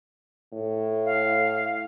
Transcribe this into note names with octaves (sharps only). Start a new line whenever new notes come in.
A2
F5